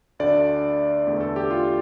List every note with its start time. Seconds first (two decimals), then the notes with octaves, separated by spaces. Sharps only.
0.19 D2 D3 A3 D5
1.07 E2 D3 A3
1.21 A4
1.36 G4
1.51 F4